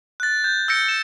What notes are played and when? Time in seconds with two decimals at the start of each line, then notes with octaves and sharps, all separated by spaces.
0.20 F#6 A6
0.44 G6
0.68 E6 G6 A#6 C#7 D7
0.89 E7